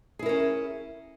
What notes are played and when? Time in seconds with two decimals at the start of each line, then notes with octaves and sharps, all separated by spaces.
0.19 G#4
0.23 E4
0.26 A#4
0.29 C#4